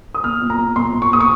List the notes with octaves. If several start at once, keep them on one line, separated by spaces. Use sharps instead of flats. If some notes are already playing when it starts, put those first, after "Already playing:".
D#6
A#2 F6
A#2
A#5
A#2
A#2 C6
A#2
C#6
A#2 D#6
C#6